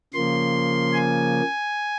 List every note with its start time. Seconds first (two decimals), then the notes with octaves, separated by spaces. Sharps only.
0.14 C#3 F3 A#3 C6
0.93 G#5